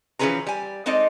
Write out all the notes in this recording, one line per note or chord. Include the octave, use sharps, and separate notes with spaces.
E3 F3 C#4 G#4 B4 A#5
G3 G#5
G#3 C4 D#4 A4 D5 D#5